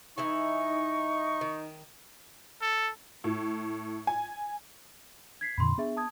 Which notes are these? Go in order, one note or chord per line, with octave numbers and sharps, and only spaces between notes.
E3 D#4 E4 G#5 C#6
D#3
A4
A2
G#5
G#6 B6 C7
F2 A#2 D3 B5 C6
B3 D4 G#4 E5
A5 D#6 G#6